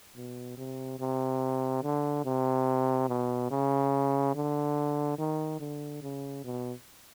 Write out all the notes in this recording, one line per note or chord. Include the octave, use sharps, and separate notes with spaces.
B2
C3
C3
D3
C3
B2
C#3
D3
D#3
D3
C#3
B2